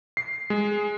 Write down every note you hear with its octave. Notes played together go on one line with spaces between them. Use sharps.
C7
G#3